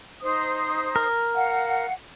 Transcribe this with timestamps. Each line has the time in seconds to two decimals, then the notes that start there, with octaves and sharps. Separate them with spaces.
0.22 D#4 C5 D#6
0.96 A#4
1.34 F5 F#5